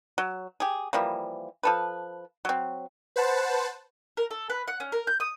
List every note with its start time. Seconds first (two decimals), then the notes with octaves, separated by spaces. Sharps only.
0.18 F#3
0.60 G4 G#4
0.93 E3 F3 G3 A#3
1.63 F3 A4 B4
2.45 F#3 C4
3.16 B4 C5 F#5 A5
4.17 A#4
4.31 A4
4.50 B4
4.68 F#5
4.80 C#4
4.92 A#4
5.07 G6
5.20 D#6